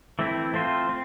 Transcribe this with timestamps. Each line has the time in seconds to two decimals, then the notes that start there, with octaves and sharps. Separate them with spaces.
0.19 E3 A3 C4 E4
0.54 A3 C4 F4 C5
0.89 C4